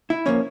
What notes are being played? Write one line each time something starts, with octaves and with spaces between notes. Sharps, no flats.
E4
F3 A#3 C#4 C#5